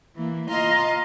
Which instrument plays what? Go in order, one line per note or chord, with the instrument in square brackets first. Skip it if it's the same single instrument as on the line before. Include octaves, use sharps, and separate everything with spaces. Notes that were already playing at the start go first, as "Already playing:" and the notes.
[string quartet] E3 A#3
F4 D#5 F5 A#5 C6